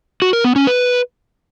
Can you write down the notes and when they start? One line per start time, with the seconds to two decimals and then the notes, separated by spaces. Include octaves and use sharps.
0.22 F#4
0.33 A#4
0.44 B3
0.56 C#4
0.67 B4